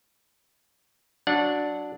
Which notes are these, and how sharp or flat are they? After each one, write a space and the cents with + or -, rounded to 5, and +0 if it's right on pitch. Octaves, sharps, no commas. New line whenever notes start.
F#3 +0 D4 +0 F#5 -25